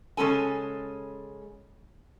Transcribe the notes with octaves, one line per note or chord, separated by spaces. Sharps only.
C#3 G#3 C#4 A4 G#5